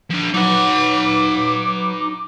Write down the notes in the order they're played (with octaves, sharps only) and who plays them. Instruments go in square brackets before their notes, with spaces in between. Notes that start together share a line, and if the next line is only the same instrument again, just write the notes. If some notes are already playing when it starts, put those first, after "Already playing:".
[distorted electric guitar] F3 D4
[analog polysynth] F#3 B4 [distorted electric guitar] D#4 F#5 [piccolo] D6